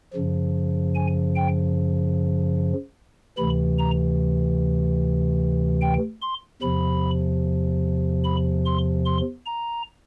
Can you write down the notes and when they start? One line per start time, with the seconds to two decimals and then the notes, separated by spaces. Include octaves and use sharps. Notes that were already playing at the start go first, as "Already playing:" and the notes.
0.14 F#2 C#3 F3
0.95 G#5
1.35 G5
3.37 D2 C3 E3 B5
3.79 A#5
5.81 G5
6.21 C6
6.62 E2 C3 F3 B5
8.24 B5
8.65 C6
9.05 C6
9.46 A#5